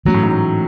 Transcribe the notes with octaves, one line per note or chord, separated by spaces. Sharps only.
E3 F#3 A3 C#4
A2
G#2
F#3